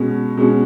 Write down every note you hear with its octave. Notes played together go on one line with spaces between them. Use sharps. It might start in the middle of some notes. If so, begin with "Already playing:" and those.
Already playing: B2 G#3 C#4 F#4
B2 G#3 C#4 F#4